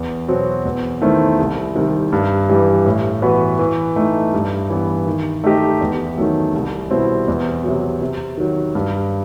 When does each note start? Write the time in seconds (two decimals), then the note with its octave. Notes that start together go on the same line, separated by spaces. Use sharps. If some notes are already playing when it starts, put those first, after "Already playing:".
Already playing: E2
0.28 B2 F#3 C4
0.65 E2
1.01 D#3 A3 C4 E4
1.38 C2
1.75 C3 D#3 G3
2.12 G2
2.50 E3 G3
2.86 A2
3.22 E3 B3 F#4 B4
3.59 E3
3.96 A3 D#4
4.33 G2
4.70 E3 B3
5.06 D#3
5.44 A3 D#4 G4 D#5
5.81 E2
6.17 D#3 F#3 A3
6.54 C2
6.91 B2 G3 C4 E4
7.28 E2
7.64 C3 F#3
8.02 C3
8.37 D#3 F#3
8.75 G2